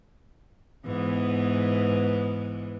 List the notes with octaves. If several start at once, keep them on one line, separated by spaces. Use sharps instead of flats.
G#2 E3 B3